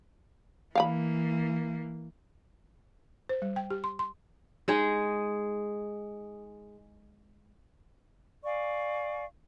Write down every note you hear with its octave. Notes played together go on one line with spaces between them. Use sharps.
E3 A#3 F5 G5 B5
C5
G3
G5
G4
C6
C6
G#3 D#4 G#4
D5 F5 G#5 C#6